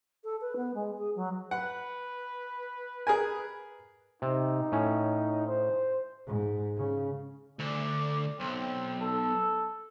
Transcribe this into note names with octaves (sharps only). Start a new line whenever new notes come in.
A4
B4
B3
G#3
G#4
F#3
B4 F#5
G#4 A#4 G#5
C3 D#4
A2 C#4
C5
G#2
C#3
D2 D5
B1 C4
A4